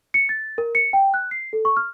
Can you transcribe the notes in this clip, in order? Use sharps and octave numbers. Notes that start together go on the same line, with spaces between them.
C#7
A6
A#4
C#7
G5
F#6
C7
A4
C#6
F6